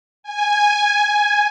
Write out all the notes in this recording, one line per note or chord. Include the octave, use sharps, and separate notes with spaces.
G#5